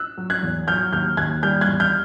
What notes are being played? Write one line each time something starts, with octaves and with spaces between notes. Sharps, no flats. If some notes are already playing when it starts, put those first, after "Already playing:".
Already playing: E6 F#6
F#3
F#6 G#6
E2
F#3 F6 G6
D#2 F6 G6
D#2 F#6 G#6
G3 F6 G6
F#6 G#6
E2
F6 G6